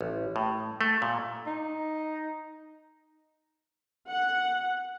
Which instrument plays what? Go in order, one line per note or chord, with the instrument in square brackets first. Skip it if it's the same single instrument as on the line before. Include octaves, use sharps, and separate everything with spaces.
[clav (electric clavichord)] A1
A2
A3
A#2
[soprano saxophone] D#4
[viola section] F#5